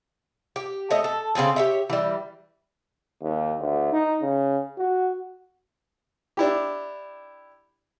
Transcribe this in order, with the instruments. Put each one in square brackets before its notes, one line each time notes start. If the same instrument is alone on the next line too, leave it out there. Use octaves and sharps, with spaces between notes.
[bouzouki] G4
A3 C#5 D#5
A4
C#3 C4 G#4 A4
G4 C#5 E5
E3 G3
[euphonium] D#2
D2
D#4
C#3
F#4
[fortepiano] D4 E4 G4